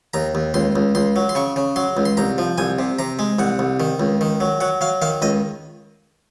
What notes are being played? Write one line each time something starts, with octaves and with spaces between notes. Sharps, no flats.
D#2 A#5
D#2
C#2 C6
C#2
C#2 C6
F#3
C6
C#3 C#6
C#3
F#3 C6
C#2
C6
C2 A#5
F3
C2 G#5
C3
C3 A#5
G#3
C2 F#5
C2
D#3
C#2
D#3
F#3
F#3 F#5
F#3 F5
D#3 F5
C#2 D#5